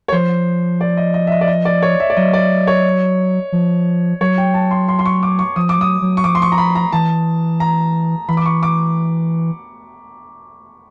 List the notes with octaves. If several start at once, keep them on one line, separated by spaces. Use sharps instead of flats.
C#5
F3 C5
D5
D#5
D#5
E5
D#5
D5
D#5
D5
C#5
E5
D5
F#3 D#5
D5
C#5
F3
F#3 C#5
G5
A5
C6
C6
C6
C#6
D6
C#6
F3 D#6
D6
F#3 D#6
F#3
C#6
F3 D6
C6
C#6
A#5
B5
A#5
E3 A5
A#5
E3 B5
D6
C#6
D6